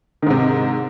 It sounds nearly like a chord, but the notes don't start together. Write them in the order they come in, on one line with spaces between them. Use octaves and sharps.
D#3 G#2 C3